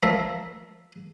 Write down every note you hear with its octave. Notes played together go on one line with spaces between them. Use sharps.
F3 A3 A4 A#4 E5